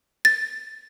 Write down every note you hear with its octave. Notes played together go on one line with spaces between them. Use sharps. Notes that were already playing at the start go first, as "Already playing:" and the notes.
A6